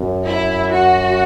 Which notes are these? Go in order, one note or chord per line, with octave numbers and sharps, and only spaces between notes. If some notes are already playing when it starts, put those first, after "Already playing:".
Already playing: F#2
E4
F#4